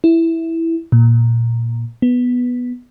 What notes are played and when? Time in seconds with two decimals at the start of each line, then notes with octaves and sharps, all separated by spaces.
0.04 E4
0.92 A#2
2.02 B3